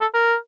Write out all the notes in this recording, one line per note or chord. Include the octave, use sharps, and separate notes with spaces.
A4
A#4